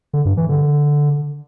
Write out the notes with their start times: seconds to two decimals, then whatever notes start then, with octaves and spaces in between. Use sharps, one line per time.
0.13 D3
0.25 G2
0.37 E3
0.49 D3